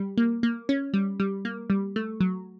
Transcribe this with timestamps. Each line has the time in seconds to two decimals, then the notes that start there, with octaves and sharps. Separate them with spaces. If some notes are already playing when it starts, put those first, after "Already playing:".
Already playing: G3
0.18 A#3
0.43 A#3
0.69 C#4
0.94 G3
1.20 G3
1.45 A#3
1.70 G3
1.96 A3
2.20 F#3